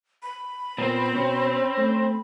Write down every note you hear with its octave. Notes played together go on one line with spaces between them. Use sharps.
B5
A#2 B3 C4 A#4 C5
B2 C#4
A3